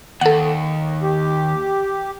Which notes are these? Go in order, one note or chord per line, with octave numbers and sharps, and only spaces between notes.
D#2 A4 F#5
G4